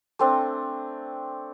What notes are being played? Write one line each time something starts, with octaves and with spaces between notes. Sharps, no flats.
A3 C4 D4